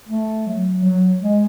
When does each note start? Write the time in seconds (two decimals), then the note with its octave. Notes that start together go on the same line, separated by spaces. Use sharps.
0.09 A3
0.47 F#3
0.84 F#3
1.22 G#3